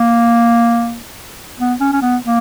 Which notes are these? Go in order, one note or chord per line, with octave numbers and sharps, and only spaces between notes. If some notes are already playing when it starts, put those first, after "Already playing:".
Already playing: A#3
B3
C#4
C#4
B3
A#3